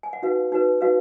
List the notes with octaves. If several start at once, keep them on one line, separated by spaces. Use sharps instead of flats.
G#5
F#5
D#4 F#4 B4 F5
D#4 F#4 B4
D#4 F#4 B4 F5